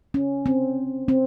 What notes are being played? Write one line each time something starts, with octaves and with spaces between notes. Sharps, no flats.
C#4
C4
C4